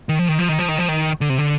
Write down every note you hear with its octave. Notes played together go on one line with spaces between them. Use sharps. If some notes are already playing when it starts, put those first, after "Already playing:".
D#3
F3
D#3
F3
D#3
F3
D#3
F3
D#3
D3
C3
D3